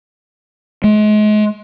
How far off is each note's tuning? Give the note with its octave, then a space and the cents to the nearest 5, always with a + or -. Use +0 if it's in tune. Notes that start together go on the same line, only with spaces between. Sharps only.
G#3 +35